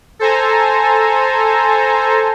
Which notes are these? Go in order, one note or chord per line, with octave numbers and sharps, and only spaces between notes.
A4 C5 G#5 A#5